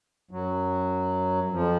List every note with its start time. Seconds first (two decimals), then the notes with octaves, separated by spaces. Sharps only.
0.31 F#2 F#3
1.52 F2 F3